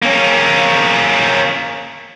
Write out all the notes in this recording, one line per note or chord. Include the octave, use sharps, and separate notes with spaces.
A#3 C#4